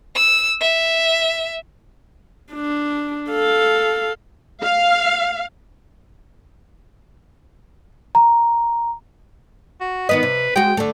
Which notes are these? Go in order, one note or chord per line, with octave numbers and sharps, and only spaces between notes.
E6
E5
D4
A4 F5
F5
A#5
F#4
D#3 B3 B4 D#5
C3
G#3 F#4 G5
D3 A3